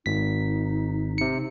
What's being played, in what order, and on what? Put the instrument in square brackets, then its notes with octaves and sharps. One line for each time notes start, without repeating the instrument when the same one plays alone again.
[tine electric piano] G#1 B6 [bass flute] D#4
[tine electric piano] C3 C#7